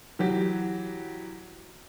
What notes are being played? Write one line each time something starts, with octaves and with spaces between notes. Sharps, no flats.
E3 F#3 G4